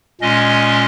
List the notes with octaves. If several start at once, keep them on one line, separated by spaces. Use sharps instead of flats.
A#2 G#3 C#4 D#5